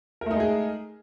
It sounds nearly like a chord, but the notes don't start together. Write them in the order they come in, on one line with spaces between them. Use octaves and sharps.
A#4 A3 D#4 G#3 G#4